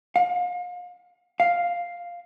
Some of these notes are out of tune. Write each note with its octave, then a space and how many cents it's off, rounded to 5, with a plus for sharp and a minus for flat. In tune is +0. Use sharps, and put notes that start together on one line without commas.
F5 +35
F5 +0